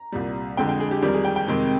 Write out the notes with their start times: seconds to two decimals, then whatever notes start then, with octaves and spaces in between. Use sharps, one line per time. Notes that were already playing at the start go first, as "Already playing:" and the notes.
Already playing: A#5
0.12 C2 A#2 G3
0.57 F2 D3 G#3 G5
0.69 G5
0.80 G#4
0.91 G4
1.02 F2 D#3 G3 G4
1.08 A#4
1.14 G#4
1.25 G5
1.36 G5
1.48 F2 C3 D#3 G#3